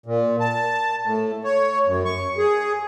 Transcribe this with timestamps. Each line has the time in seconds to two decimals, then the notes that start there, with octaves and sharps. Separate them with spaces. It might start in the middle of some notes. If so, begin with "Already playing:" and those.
0.06 A#2
0.40 A5
1.05 A2
1.44 C#5
1.86 F#2
2.05 C#6
2.38 G#4